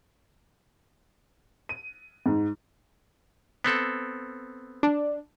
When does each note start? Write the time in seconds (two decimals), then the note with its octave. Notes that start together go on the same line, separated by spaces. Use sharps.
1.69 D#7
2.26 G#2
3.64 B3 C4 A4
4.83 D4